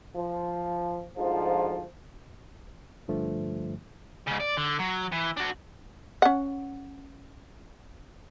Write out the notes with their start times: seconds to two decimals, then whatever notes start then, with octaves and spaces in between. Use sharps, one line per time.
0.16 F3
1.17 D2 G#2 F3
3.08 G2 D3 F3 A3
4.27 G#2 C#3
4.40 D5
4.57 D3
4.79 F#3
5.12 E3
5.37 D4 F#4
6.22 C#4 F#5